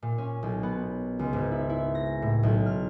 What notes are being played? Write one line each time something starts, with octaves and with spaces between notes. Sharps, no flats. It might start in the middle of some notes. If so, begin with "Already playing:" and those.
A#2
C#4
B1
B3
C#2
G#1
E4
E4
A#6
A2
B1
F6